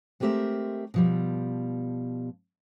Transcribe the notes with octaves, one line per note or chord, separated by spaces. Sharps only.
G#3 A3 C4 G4 A#4 E5
B2 F3 G3